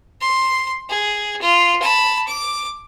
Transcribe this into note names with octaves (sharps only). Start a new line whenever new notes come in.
C6
G#4
F4
A5 B5
D6